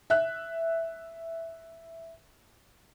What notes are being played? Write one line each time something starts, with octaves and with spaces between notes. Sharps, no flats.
E5 F#6